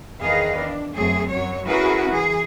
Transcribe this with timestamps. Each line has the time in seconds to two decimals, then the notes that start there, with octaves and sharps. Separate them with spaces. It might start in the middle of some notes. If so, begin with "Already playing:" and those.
0.22 E2 D#3 G#4 B4 D#5 F5
0.58 D4
0.94 F#2 A3 C4 G#4
1.29 F#2 F#3 C#5
1.66 C#4 E4 F#4 G#4 A#4 B4
2.10 E3 G#4